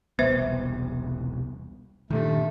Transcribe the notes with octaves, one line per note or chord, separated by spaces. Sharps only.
E1 C2 B3 B4 C5 E5
G2 A#2 D#3 A3